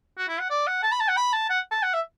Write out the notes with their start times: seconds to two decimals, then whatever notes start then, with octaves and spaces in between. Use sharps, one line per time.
0.18 F#4
0.28 E4
0.40 F#5
0.50 D5
0.67 F#5
0.83 A5
0.92 B5
1.00 A5
1.08 F#5
1.17 B5
1.33 A5
1.50 F#5
1.72 A5
1.83 F#5
1.94 E5